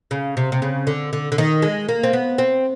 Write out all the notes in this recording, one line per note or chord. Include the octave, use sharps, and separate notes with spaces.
C#3
C3
C3
C#3
D3
D3
D3
D#3
G#3
A#3
C4
B3
C4